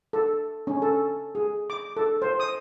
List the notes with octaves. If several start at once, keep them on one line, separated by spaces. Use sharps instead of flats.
A4
C#4
A4
G#4
D6
A4
C5
D#6